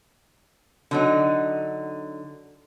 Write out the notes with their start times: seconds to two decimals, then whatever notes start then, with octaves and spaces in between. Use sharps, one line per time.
0.91 D3 F#3 D#4